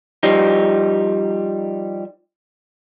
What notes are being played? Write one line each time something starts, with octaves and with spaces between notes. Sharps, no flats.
F3 G3 D#4